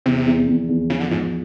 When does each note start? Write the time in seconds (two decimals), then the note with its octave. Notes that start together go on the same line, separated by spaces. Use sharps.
0.06 E2 C3
0.26 E2
0.47 E2
0.69 E2
0.90 C#3 F3
1.00 D3
1.11 G#2 F3